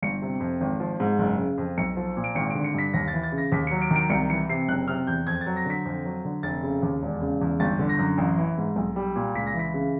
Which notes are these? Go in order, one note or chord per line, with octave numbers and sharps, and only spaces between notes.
G1 C#7
C3
F2
G#1
F3
G#2
F#1
C#3
F2
B1 C#7
F3
A#2
D7
G#1 C#7
D7
D3
C#7
G2 B6
D#2 A#6
A6
E3
A6
C#3
A#6
D#2 B6
C#7
F#3
D7
D#3
D7
C2 C#7
E3 C#7
C3 C7
F#1 F#6
C3 F6
E2 G6
F2 G#6
A6
F#3
A#6
D3 B6
F2
F#3
D3
F1 A6
C#3
D#2
E1
C#3
E2
G1 A6
D3
A#6
F#2
A1
E3
G#2
B1
G3
A#2
C#2 B6
A#6
E3
B6
C#3